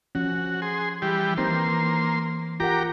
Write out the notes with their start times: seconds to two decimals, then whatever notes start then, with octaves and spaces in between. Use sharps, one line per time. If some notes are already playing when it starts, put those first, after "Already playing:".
0.15 F3 C#4 F#4
0.62 G#4 C6
1.02 E3 G3 G4
1.38 E3 A#3 C4 D#4 C6
2.60 F4 G4 A#4 F#5 A#5 D6